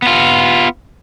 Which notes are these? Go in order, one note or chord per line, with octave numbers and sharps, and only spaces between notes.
B3 F4